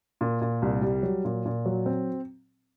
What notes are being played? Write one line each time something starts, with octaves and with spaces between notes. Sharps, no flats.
A#2
A#2
C2
G3
F#3
A#2
A#2
F#3
C4